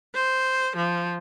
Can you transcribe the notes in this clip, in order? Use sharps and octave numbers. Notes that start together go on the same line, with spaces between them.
C5
F3